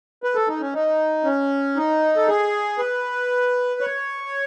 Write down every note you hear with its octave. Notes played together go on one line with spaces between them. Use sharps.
B4
A4
D#4
C#4
D#4
C#4
D#4
A4
G#4
B4
C#5